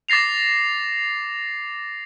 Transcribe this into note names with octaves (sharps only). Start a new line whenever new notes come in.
D6 A6 A#6 C7 F7